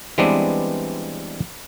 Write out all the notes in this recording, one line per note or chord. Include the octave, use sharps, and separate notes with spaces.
E3 G3 G#3 B3 C4 D4